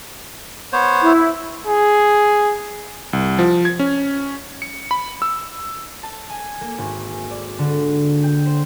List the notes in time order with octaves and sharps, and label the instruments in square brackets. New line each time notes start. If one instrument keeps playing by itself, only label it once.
[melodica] B3 C5 C#5
[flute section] E4
[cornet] G#4
[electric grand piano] C2
F3
G#6
C#4
C#7
B5
E6
[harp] A5
G#5
A#3
G#1
D5
D3
G5
C5